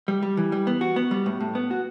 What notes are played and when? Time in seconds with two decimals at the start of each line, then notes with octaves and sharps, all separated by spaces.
0.08 G3
0.23 G3
0.37 E3
0.52 G3
0.67 B3
0.81 F#4
0.96 B3
1.11 G3
1.26 A2
1.40 A2
1.55 B3
1.71 F#4